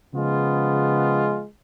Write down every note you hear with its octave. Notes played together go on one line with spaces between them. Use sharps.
C#3 F3 G#3 B3 F4